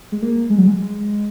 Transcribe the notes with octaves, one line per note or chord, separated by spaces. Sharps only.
G#3
A#3
G#3
F#3
G#3